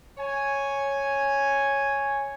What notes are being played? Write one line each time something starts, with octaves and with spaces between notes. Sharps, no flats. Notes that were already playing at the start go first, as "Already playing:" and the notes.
C#5 G#5